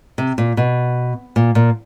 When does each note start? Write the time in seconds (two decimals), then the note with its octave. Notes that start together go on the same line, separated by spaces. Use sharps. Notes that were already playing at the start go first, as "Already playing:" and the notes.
0.18 C3
0.38 A#2
0.57 B2
1.36 A#2
1.55 A#2